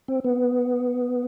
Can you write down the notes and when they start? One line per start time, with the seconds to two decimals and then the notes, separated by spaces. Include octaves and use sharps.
0.08 C4
0.24 B3